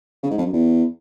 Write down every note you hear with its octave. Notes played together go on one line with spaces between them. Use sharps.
C#3
G#2
F2
F#2
E2